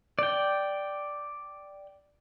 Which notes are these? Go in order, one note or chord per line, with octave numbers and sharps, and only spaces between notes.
D5 G5